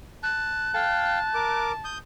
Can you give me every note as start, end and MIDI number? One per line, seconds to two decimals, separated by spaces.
0.23 0.72 81
0.23 1.64 90
0.74 1.19 77
0.74 1.19 79
0.74 2.00 81
1.34 1.72 70
1.34 1.72 86
1.84 1.98 87
1.84 1.98 91